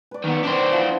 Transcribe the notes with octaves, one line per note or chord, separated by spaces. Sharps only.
B4 D5
D#3 B3
D#3 D4 C5 D#5
F3 E4 F#5